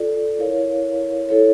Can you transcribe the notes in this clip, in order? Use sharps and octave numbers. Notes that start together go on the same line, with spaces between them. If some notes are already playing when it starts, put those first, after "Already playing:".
Already playing: F4 A4 D5
E4 A#4 C#5 F5
E4 A4 C#5